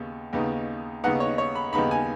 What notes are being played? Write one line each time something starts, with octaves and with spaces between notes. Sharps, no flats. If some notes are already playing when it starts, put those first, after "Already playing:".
Already playing: D#2 C#3 B3
D#2 C#3 B3 D#4
D#2 C#3 B3 D#4 F#5
C#5
C#5
B5
D#2 C#3 B3 D#4 B5
G#5